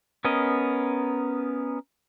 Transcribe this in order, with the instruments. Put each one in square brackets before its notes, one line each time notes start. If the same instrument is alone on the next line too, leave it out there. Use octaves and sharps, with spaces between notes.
[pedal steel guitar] B3 C#4 A#4 D#5